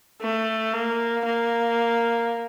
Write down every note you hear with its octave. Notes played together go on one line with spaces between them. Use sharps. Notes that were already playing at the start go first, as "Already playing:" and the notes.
A3
A#3
A#3